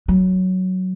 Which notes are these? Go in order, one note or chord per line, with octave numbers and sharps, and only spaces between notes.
F#3